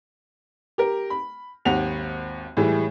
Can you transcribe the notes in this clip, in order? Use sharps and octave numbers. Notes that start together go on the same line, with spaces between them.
G4 A#4
B5
G#1 D#2 F#5 F7
A2 E3 G3 G#3